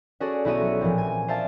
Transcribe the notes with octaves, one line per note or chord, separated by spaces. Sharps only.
C#4 F#4 G#4 A4 C#5 D5
B1 E4 F#4 C#5 D#7
F#3
A1 A#2 E3 F3 C4
G#5
C5 D5 E5 F5 A5